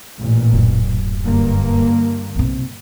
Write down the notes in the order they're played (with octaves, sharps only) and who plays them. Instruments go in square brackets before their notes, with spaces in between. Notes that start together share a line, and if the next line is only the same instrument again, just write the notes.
[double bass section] A1 A#2
[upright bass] D1 F#2
[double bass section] G2 D3 A#3
[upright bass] B1 C3